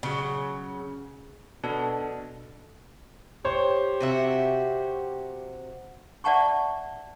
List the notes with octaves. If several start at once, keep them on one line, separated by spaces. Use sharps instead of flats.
C#3 F#3
B2 D4 A4
G4 C5 C#5
C3 F#4 E5
D5 E5 F#5 A5 A#5 C#6